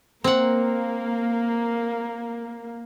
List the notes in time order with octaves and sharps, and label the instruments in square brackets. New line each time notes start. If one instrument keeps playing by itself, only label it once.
[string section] A#3 [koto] C4 F#5